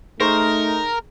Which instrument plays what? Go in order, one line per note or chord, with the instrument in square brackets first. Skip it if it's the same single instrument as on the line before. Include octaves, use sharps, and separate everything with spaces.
[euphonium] A3 [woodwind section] D#4 [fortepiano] G#4 C5 C#6 [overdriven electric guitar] A#4